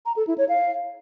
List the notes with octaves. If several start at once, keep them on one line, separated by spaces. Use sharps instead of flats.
A#5
A4
E4
C#5
F5